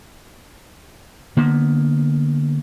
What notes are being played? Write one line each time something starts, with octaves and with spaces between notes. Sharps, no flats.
D3 A#3 B3